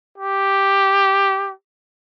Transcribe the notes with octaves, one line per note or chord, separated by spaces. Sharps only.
G4